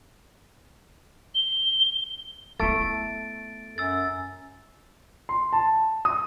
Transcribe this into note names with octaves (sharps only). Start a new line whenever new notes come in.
G7
A3 B3 E4 A6 D7
F#2 E6 A6
C6
A5
D#6